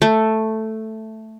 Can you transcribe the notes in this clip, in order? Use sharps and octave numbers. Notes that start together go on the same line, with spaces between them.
A3